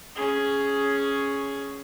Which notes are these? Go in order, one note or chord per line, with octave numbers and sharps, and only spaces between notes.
C#4 G#4